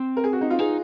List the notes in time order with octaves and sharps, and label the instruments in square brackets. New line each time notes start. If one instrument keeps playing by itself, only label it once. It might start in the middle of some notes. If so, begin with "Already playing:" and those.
Already playing: [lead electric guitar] C4
[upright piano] A#4
G#4
F#4
D#4
F4
[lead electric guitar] D#4 [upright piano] G#4